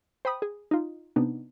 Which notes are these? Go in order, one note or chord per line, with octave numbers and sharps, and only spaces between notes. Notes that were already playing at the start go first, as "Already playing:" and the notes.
C5 G5 B5 D#6
G#4
D#4 F4
C3 B3 D4 D#4